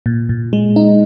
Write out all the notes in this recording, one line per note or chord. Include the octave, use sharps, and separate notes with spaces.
A#2
A#2
G#3
D#4